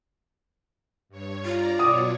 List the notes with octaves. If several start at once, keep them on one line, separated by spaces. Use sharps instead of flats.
G2 C#5
F4 D5 A#5
B2 F#3 G4 G#4 C#5 D5 D6 D#6